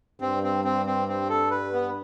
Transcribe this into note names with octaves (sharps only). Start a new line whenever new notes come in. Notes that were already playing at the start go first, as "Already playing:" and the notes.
G2 C4
C4
C4
C4
C4
A4
B4
B3